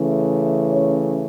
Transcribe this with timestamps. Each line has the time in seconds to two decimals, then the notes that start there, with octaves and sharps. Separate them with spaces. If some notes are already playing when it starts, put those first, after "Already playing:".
Already playing: C#3 E3 A3 C#4
0.70 C#5